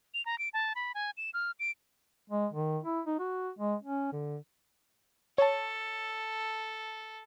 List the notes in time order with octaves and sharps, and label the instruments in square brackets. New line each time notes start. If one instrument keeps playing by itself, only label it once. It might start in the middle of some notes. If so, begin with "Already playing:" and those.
[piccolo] F7
A#5
D7
A5
B5
G#5
E7
F6
D7
[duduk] G#3
D#3
E4
D#4
F#4
G#3
C#4
D3
[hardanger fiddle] A4 [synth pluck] C#5 A5